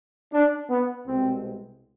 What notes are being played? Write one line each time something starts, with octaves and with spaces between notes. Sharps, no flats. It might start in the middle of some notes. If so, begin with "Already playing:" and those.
D4
B3
C2 B2 G#3 C4